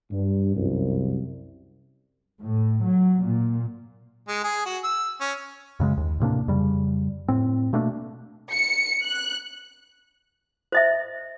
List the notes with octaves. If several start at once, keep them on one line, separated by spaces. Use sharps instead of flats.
G2
C2 F#2
A2
F#3
A#2
G#3
G#4
F#4
E6
C#4
F#2 C#3 G#3
D#2
A2 C3 A#3 D4
F2 C#3 G3
A2 C4
B2 A3 A#3 D4
C#7
F#6
C5 D#5 E5